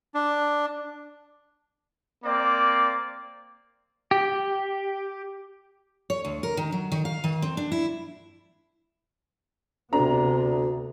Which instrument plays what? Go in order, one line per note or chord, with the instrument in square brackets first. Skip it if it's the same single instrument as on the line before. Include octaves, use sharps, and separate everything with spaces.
[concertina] D4
[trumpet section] A#3 C4 D5
[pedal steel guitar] G4
[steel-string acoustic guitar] C#5
D2
A#4
D#3
F#3
D#3
F5
D#3
C4
D4
E4
[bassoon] D2 [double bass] C3 B3 [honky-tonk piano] D4 A#5